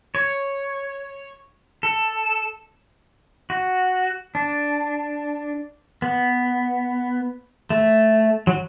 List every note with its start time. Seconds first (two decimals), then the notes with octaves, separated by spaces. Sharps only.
0.15 C#5
1.83 A4
3.50 F#4
4.35 D4
6.02 B3
7.70 A3
8.47 F#3